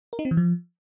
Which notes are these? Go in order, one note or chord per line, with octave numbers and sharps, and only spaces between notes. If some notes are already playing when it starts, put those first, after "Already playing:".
A#4
D#4
C4
E3
F3